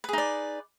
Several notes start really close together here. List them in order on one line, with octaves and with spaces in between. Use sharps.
B4 G#4 D#4 D5